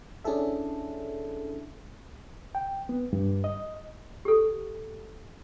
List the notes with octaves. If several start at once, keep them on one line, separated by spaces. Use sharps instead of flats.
C#4 D4 E4 G#4 A4 E5
G5
B3
G2
D#5
G4 A4